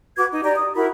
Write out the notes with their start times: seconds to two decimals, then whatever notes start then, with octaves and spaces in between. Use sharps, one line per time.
0.17 F#4 B4 D6 G#6
0.31 D#4
0.43 G4 D5 A#5
0.56 D#6
0.75 E4 F#4 A#4 B5